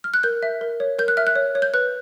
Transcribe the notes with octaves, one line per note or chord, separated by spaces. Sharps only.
F6
F#6
A#4 G6
E5
A#4
C#5
A#4 G6
F#6
E5 F6
F#6
C#5
C#5
G6
B4 F#6